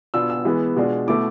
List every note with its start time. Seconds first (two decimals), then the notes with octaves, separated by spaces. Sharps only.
0.14 B2 B3 D4 F4 E6
0.30 E6
0.45 E3 G#3 B3
0.76 B2 G#3 D4 F4
1.07 B2 A3 E4 D6